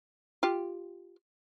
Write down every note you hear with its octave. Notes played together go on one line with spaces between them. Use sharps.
F4 G4